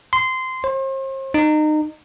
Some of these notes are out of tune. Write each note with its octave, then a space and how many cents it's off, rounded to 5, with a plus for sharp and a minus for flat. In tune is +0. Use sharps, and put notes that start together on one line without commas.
C6 -15
C5 +40
D#4 -25